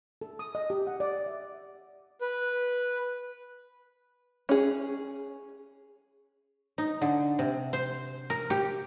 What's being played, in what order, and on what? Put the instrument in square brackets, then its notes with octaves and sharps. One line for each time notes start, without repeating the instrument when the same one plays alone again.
[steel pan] A4
D#6
D#5
G4
F#5
D5
E5
[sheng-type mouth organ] B4
[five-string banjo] C#4 G#4
[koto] D#4
D3
C3
C5
A#4
G4